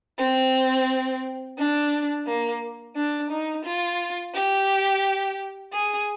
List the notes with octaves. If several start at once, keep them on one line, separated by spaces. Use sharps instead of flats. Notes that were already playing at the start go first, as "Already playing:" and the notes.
C4
D4
A#3
D4
D#4
F4
G4
G#4